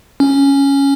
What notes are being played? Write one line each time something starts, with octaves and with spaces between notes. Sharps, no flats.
C#4